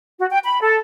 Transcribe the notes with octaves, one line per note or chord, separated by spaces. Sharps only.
F#4
G5
B5
A4